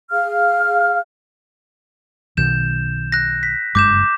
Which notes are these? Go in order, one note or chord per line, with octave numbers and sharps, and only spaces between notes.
G#4 F5 F6
B1 B2 D#3 G6 E7
F#6 A#6
B6
F#1 G2 G#3 D6 G6 E7